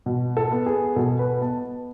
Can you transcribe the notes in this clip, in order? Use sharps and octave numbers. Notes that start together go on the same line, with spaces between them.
B2
A4
B3
G#4
B2 A4
B4
B3 A5